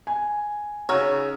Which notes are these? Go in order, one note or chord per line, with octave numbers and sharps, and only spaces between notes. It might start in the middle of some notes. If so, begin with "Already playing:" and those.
G#5
C#3 D#4 F#4 C#5 A#5 E6 F6